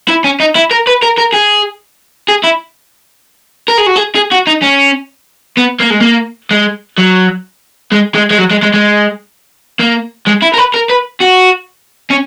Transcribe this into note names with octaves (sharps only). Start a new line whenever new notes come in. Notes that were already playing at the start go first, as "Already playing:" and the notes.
E4
C#4
D#4
E4
A#4
B4
A#4
A#4
G#4
G#4
E4
A#4
G#4
F#4
G#4
G#4
F#4
D#4
C#4
B3
A#3
G#3
A#3
G#3
F#3
G#3
G#3
G#3
F#3
G#3
G#3
G#3
A#3
G#3
E4
A#4
B4
A#4
B4
F#4
C#4